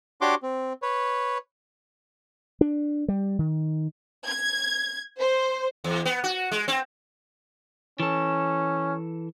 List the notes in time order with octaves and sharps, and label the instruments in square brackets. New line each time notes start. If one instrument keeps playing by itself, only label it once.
[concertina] D4 F#4 G4 C#5 C6 D6
C4
B4 C#5
[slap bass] D4
G3
D#3
[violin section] G#6
C5
[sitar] E2
B3
F#4
G#3
C4
[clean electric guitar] E3 A4 [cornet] C#4